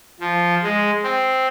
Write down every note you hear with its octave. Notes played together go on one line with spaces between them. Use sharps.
F3
G#3
C4